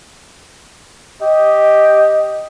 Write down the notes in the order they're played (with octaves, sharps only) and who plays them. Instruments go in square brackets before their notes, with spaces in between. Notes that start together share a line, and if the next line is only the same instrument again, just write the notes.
[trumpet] G4 [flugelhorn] D#5